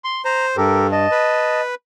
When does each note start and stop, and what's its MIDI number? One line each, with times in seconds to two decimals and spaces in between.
0.04 0.22 84
0.25 0.56 72
0.25 0.46 82
0.57 1.07 43
0.57 0.87 67
0.57 0.87 69
0.57 0.87 70
0.92 1.61 75
0.92 1.61 81
1.11 1.75 71